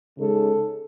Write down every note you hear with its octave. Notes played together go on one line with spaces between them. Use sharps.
C#3 G#3 D#4 A4